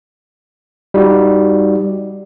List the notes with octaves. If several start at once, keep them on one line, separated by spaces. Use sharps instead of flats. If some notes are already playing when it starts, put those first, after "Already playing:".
G3 D#4 F#4